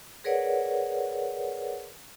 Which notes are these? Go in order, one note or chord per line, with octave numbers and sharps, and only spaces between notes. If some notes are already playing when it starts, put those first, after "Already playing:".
G#4 A#4 B4 C#5 D5 F#5